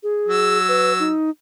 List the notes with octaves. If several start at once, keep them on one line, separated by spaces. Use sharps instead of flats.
G#4
F#3 E6
B4
D#4